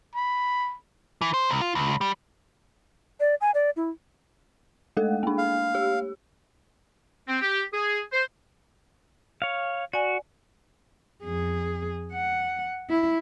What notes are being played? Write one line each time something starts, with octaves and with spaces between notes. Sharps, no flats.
B5
E3
C5
C2
F4
C#2
G3
D5
G#5
D5
E4
G#3 A3 A4
A#3 D4
F5
G4
C4
G4
G#4
C5
C#5 F5
F#4 D5 G#5
F2 G#4
F#5
E4